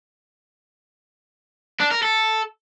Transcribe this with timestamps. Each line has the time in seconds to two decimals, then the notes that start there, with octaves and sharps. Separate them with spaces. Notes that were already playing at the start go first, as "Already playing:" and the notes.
1.80 D4
1.91 A#4
2.03 A4